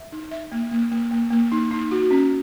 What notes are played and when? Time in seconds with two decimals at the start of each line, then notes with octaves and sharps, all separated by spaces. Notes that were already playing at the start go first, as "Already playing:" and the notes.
Already playing: E5
0.12 D#4
0.31 E5
0.52 A#3
0.71 A#3
0.91 A#3
1.11 A#3
1.31 A#3
1.52 D#4
1.71 D#4
1.91 F#4
2.11 C#4